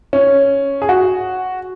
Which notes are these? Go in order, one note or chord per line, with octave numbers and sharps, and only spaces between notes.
C#4
G#4
F#4